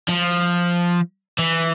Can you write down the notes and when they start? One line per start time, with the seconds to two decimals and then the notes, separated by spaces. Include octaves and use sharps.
0.08 F3
1.38 E3